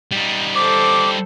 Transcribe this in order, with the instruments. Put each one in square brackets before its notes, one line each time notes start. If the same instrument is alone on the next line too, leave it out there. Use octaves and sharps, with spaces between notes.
[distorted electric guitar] G3 D#4
[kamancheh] A4 C5 [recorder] D6